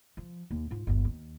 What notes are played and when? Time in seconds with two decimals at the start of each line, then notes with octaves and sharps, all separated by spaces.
0.17 F3
0.51 D#2
0.71 G#2 F4
0.87 G1 D#2
1.05 D#2